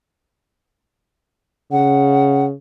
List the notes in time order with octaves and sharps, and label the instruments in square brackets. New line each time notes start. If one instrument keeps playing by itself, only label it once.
[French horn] C#3 [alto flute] F#5